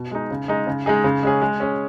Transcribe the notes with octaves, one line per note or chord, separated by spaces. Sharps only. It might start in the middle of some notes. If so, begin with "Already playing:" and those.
Already playing: B2
G#3 D#4
C#3
G#3 D#4
C#3
G#3 D#4 G#4
C#3
G#3 C#4 G#4
G#3
C#4 G#4